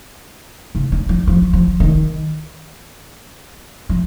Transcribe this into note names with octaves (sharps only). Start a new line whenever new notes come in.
C#3
D#3
F3
F3
F3
D#3
F3